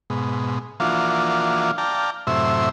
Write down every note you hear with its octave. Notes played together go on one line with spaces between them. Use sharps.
G#2 B2
E3 F3 A#3 D4 F4 F#4
D5 F5 G5 A5 A#5
F#2 A2 C3 E4 C5 E5